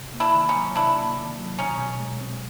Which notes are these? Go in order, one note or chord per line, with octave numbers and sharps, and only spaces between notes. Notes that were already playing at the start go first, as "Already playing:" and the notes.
Already playing: C3
A#3
D4 E4
D#3
C#4 D#4
F#3
C3 D4 E4
A#3
D#3
F#3
B2 C#4 D#4
B2
G#3
C4